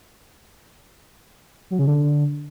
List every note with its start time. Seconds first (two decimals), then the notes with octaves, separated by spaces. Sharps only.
1.71 F#3
1.79 C#3
1.87 D3